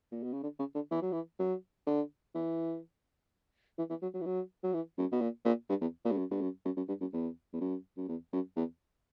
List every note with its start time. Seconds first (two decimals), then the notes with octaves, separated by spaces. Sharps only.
0.12 A#2
0.23 B2
0.33 C#3
0.43 D3
0.59 C#3
0.75 D3
0.91 E3
1.02 F#3
1.12 E3
1.39 F#3
1.87 D3
2.35 E3
3.78 E3
3.90 E3
4.02 F#3
4.14 F#3
4.21 E3
4.26 F#3
4.63 F#3
4.74 E3
4.98 F#2
5.12 B2
5.21 A#2
5.45 A#2
5.69 G2
5.81 E2
6.05 A#2
6.12 G2
6.17 F#2
6.31 G2
6.41 F#2
6.65 F#2
6.77 F#2
6.88 G2
7.01 F#2
7.13 E2
7.53 E2
7.60 F#2
7.97 F#2
8.08 E2
8.33 F#2
8.56 E2